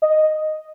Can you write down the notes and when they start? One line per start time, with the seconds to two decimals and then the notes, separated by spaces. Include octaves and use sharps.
0.02 D#5